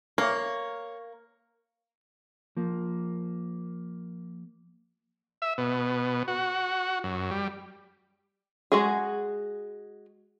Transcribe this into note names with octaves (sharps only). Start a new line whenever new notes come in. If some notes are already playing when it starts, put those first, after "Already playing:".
A#3 C#5
F3 A#3
E5
B2
F#4
F#2
G3
G#3 F#4 G#4